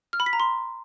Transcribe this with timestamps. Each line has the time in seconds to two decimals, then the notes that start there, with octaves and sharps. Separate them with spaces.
0.13 F6
0.20 B5
0.26 B6
0.33 A#5
0.40 C6